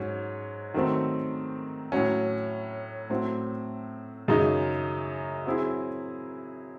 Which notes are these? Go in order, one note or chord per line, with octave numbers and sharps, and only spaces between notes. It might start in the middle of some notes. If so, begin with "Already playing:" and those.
Already playing: G#2 F#3 C#4
D#3 F#3 A3 C4
A2 F#3 C#4
A2 F#3 C4
F#2 C#3 G#3 D#4
F#3 C4 E4 G#4